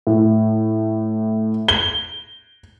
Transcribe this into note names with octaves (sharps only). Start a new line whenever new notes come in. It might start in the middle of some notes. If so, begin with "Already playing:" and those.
A2
G7